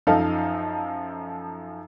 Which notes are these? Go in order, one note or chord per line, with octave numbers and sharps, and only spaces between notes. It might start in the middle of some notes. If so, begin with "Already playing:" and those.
F#2 F3 D#4 A4 D#5 F5